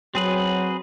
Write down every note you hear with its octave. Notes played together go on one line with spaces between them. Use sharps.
F#3 C4 G#4 B4